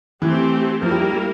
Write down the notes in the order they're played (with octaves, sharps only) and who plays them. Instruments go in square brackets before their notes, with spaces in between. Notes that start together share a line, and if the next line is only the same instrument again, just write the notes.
[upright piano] E3 [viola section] A3 C4 G4
[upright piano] F3 [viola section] A#3 E4 A#4
[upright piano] G3
G3
G3